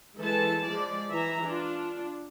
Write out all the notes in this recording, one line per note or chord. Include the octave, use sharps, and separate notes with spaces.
E3 G#3 A4 A5
F3 G#3 D5
E3 E5 A#5
D4 F4